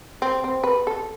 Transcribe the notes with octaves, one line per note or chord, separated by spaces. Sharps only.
C4
C4
B4
A4